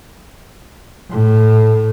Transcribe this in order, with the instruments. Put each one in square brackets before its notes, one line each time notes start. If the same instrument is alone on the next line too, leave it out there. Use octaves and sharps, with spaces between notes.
[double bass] A2